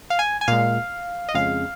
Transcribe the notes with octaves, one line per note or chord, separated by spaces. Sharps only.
F5
G#5
G#5
A#2 G#3 F5
D#5
F2 C#3 G#3 F5